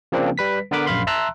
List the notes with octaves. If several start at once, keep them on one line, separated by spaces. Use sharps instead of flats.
C#3 F3 A#3 C4 D4
G3 B4 B6
D3 B3 A#4 B4 B5 D6
A#1 F#2 F5 B5 C6
E5 A5 A#5 C6 E6 F#6